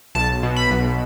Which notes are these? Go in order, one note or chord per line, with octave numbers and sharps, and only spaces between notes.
B1 A5
B2
B5
B1